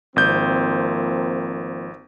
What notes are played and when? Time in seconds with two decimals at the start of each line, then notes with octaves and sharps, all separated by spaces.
0.16 G#1 F3 A#3 C4 G6